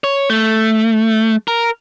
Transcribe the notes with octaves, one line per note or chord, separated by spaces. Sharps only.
C#5
A3
A#4